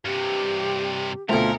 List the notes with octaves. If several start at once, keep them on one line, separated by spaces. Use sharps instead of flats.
G2 C3 G4
D2 B2 A3 C4 F4 A#4